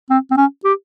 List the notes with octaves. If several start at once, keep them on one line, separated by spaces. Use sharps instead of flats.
C4
C4
C#4
G4